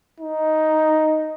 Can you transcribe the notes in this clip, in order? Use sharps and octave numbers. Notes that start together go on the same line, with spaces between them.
D#4